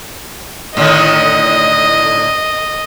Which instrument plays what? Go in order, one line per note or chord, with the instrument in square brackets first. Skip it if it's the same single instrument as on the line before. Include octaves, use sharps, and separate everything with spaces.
[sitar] A2 D3 D#3 [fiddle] D#5